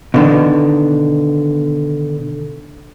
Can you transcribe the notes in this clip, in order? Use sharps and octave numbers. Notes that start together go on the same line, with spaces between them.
B2 D3 D#3